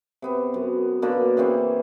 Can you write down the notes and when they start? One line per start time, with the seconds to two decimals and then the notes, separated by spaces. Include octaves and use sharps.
0.22 C3 B3 C4
0.54 F#2
1.02 B2 D3 A#3 C#4
1.37 C#3 E3 C4 C#4